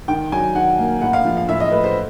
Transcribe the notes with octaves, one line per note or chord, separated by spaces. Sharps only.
D#3 G5
F#3 G#5
D#3 F#5
A#3
A2 F#5
F5
F3
F5
A2 E5
D#5
A3 B4
C5